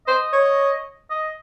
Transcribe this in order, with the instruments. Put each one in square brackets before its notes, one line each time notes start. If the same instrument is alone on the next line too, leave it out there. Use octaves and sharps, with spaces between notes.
[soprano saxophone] C5 [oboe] D#5
[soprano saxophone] C#5
[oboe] D#5